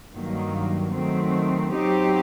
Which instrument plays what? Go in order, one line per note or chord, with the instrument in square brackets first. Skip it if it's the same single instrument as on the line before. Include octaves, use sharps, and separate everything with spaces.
[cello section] G2 D#3 F#3 A#3
D#3 F#3 A3 C4
F#3 C4 D#4 G4